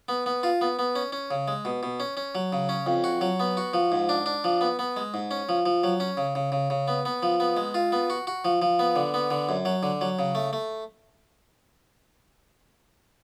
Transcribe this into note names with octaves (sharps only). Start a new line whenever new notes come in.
B3
B3
F4
B3
B3
C#4
C#4
C#3
G#3
B2
B2
C#4
C#4
F#3
C#3
C#4
F2
F#4
F#3
B3
F#4
F3
G#2
D4
D4
F3
B3
B3
G#3
G#2
C#4
F3
F3
F#3
C#4
C#3
C#3
C#3
C#3
B3
B3
F3
B3
G#3
F4
B3
F#4
F#4
F3
F3
B3
D3
B3
D3
F#2
F#3
D3
F#3
C#3
A3
A3